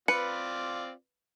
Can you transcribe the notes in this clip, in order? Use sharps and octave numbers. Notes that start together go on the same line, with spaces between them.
C4 F4 B4 D5 C#7